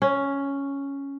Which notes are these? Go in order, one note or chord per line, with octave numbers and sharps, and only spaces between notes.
C#4